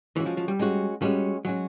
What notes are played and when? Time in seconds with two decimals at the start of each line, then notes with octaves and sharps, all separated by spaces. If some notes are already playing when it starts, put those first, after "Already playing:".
0.16 E3 G#3 C#4 F#4
0.26 F3
0.37 F3
0.48 G3
0.59 G#3 C#4 F#4
1.01 G3 G#3 C#4 F#4
1.45 F#3 G#3 C#4 F#4